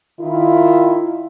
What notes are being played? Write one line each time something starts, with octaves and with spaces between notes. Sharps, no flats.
D#3 E4 F4